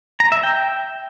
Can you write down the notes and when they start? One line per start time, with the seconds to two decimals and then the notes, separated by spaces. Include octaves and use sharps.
0.20 A#5
0.32 E5
0.43 G5